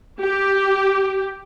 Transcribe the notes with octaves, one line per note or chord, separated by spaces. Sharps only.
G4